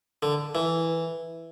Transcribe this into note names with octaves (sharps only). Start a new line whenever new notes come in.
D3
E3